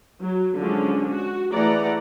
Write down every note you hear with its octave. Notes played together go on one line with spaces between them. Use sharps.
F#3
D3 F3 F#3 G#3 C#4 D4
F#4
E3 A3 G#4 D5 F#5 A#5